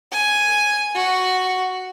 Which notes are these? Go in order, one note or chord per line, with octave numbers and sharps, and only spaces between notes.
G#5
F#4